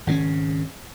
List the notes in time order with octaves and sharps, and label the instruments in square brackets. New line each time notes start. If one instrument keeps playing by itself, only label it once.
[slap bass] G#1 C#3 C4 C#4